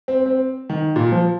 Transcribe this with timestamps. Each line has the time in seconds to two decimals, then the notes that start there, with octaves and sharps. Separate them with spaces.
0.08 C4
0.26 C4
0.70 D#3
0.96 A#2
1.12 F3